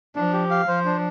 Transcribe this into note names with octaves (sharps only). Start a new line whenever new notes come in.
F3 D4
G4
F5
F3 C5
D4